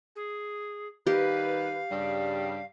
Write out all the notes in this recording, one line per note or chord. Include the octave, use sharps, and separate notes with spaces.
G#4
D#3 G3 G4 B4 F5
G2 C#3 G3